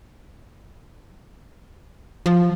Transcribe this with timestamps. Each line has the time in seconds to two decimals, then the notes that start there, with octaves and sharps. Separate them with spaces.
2.26 F3